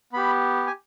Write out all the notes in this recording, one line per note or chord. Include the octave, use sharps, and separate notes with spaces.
B3 G4 B5
G#5